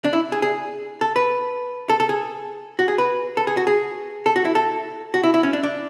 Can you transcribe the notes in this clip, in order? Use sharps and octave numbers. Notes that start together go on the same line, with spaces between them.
D4
E4
G#4
G#4
A4
B4
A4
A4
G#4
F#4
G#4
B4
A4
G#4
F#4
G#4
A4
F#4
E4
A4
F#4
E4
E4
C#4
D4
D4